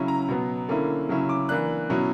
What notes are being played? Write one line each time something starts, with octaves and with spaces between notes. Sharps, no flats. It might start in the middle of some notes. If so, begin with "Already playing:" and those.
Already playing: C#3 F#3 C#4 E4
A#5
B2 F#3 B3
D3 A#3 C#4 E4
C#3 F#3 C#4 E4
D6
E3 A#3 D4 F#6
B2 F#3 C#4 E4